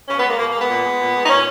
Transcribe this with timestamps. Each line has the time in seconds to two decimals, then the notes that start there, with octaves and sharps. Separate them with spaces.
0.08 B2 C#4
0.19 B3
0.24 G#3 A#3
0.38 B2 A#3
0.49 A#3
0.54 G#3
0.59 B3
0.69 A#2
0.84 G#3
0.99 A#2
1.15 G#3
1.23 D#4
1.29 A#2 C#4